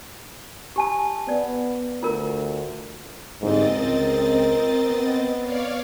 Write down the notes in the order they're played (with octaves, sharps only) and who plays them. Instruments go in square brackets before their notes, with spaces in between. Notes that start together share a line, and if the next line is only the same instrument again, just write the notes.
[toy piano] G4 G#5 A5
[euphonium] B3 [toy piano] D5
[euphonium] D2 [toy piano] F4 A#4
[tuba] G1 [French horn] G#2 [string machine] C4 D#5 A6
[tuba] C#2 [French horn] A#4
[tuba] B3
[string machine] C#5 D5 F5